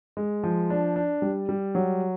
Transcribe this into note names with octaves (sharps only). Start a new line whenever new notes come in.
G#3
F3
D4
D4
G3
G3
F#3